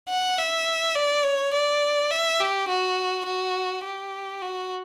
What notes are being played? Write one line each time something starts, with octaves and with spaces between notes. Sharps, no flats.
F#5
E5
D5
C#5
D5
E5
G4
F#4
F#4
G4
F#4